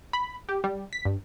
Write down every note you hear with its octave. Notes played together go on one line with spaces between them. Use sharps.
B5
G4
G3
B6
G2